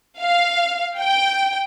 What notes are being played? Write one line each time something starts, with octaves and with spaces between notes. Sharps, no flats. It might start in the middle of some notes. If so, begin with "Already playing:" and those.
F5
G5